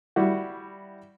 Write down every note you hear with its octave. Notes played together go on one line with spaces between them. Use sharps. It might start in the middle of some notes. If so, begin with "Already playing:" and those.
G3 E4 F#4